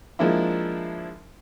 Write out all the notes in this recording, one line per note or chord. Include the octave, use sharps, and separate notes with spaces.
F3 G#3 A#3 D4 E4